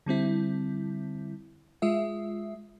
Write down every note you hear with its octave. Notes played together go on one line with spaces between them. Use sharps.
D3 G3 C4 E4
G#3 F4 E5